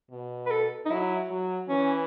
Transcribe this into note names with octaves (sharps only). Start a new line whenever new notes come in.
B2
B4
A4
D#4
F#3 E4
F#3
E3 C#4